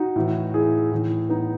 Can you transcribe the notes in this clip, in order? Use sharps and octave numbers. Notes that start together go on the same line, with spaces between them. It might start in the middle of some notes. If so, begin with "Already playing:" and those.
Already playing: D#4 F#4
A2 E3
E4 G#4
A2 E3
B3 D#4